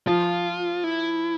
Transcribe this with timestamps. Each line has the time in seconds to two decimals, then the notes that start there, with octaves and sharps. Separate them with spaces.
0.07 F3 F4
0.84 E4